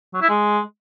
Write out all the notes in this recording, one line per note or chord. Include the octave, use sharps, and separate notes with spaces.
F#3
E4
G#3